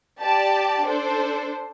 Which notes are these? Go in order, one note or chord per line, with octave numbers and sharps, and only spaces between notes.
G4 D5 A5
D4 A4 C5